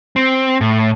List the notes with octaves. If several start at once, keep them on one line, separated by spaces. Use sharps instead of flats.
C4
A2